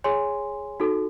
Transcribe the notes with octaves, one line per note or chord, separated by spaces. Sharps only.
G#4 C#5 G#5 C6
D#4 F#4 A4